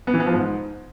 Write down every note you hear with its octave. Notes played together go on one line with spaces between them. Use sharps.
B3
E3
B3
F3
G#2